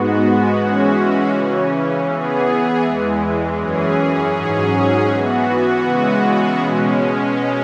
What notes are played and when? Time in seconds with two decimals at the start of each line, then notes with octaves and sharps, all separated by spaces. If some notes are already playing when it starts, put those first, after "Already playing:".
Already playing: G#2 G#3 B3 F#4
0.54 E3 G#3 C#4 F#4
1.29 C#3 E3 C#4
2.05 E3 B3 G#4
2.81 E2 E3 G#3
3.57 F#2 E3 C#4 G#4
4.33 G#2 F#3 C#4 G#4
5.07 E3 B3 F#4
5.83 C#3 E3 G#3 B3 F#4
6.59 B2 G#3 C#4